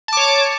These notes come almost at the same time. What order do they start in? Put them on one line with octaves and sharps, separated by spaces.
A5 D6 C#5